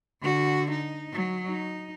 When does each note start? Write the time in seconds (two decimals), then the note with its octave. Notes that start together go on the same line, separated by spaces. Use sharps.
0.22 D3 F#4
0.71 D#4
1.13 F#3
1.47 D#4